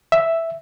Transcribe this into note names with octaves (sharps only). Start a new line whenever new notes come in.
E5